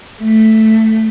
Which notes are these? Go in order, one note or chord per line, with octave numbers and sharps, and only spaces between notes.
A3